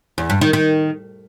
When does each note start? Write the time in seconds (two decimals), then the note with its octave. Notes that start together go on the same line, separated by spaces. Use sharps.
0.18 E2
0.30 G2
0.41 D#3
0.53 D#3